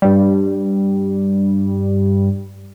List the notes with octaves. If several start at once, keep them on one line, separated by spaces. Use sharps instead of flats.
G2 G3